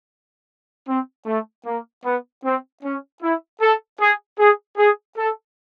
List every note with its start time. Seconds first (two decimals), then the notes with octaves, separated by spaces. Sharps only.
0.87 C4
1.25 A3
1.64 A#3
2.03 B3
2.43 C4
2.82 C#4
3.20 E4
3.60 A4
3.99 G#4
4.38 G#4
4.77 G#4
5.16 A4